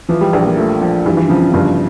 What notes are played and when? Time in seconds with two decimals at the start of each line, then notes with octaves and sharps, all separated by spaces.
0.09 E3 F3
0.21 G3
0.33 A#1
0.45 A#3
0.57 F3 A3
0.81 F3
1.05 G2 E3
1.17 E3
1.29 C#3 F3
1.42 C#3
1.53 G1 C#3